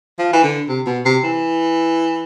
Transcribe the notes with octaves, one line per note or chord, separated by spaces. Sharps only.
F3
E3
D3
C3
B2
C3
E3